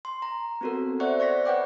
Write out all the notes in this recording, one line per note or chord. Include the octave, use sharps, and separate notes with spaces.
C6
A#5
B3 C4 F#4 A4 A#4
C5 D5 E5 F#5 C#6 F#6
C5 D5 C#6 A#6 B6
B4 C#5 F#5 G5 D6 F#6